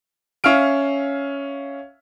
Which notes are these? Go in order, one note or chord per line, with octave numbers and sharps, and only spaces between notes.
C#4 E5 F5 F6 D7